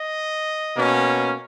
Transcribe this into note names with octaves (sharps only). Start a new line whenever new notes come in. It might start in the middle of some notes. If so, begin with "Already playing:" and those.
Already playing: D#5
B2 A#3 C#4